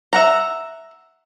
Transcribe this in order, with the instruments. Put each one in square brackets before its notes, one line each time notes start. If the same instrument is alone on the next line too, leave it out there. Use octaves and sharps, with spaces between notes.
[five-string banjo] E5 F#5 A#5